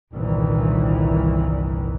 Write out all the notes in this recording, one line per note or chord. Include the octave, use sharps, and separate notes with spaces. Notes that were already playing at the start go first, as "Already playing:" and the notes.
G1 C2 A#2 D#3 E3